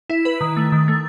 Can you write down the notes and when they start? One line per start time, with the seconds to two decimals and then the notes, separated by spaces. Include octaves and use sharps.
0.10 E4
0.25 B4
0.41 D#3
0.56 A3
0.72 D#3
0.88 A3